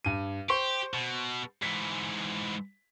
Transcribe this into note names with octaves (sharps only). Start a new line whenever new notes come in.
G2 D#7
G4 C5 C6 C#6
B2
G#2 E3 B6